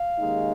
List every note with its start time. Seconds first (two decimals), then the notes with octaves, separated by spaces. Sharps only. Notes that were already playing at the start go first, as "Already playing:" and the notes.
Already playing: F5
0.17 D#2 C#3 G#3 D#4